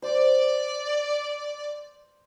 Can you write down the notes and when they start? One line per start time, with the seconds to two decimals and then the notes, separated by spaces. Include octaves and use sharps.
0.02 C5 D5